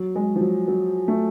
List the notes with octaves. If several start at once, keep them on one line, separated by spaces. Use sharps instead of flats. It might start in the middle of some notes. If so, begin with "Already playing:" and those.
Already playing: F#3
G#3
F3
F#3
F#3
A3